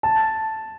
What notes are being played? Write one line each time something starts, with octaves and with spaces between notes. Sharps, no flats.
A5